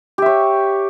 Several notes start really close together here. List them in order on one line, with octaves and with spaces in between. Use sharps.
G4 E5 C#5